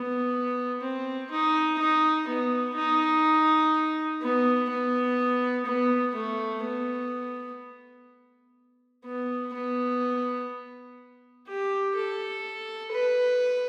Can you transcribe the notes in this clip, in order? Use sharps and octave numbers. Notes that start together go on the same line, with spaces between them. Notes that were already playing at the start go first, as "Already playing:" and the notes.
Already playing: B3
C4
D#4
D#4
B3
D#4
B3
B3
B3
A3
B3
B3
B3
G4
A4
B4